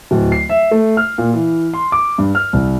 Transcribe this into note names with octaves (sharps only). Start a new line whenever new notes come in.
D1
C7
E5
A3
F6
A#2
E3
C6
D6
G2
F6
C2